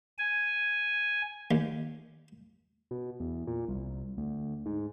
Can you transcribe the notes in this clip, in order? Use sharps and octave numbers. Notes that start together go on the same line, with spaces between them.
G#5
D#2
B2
E2
A#2
C2
D2
G#2